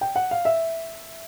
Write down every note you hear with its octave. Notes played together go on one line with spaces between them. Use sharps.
G5
F#5
F5
E5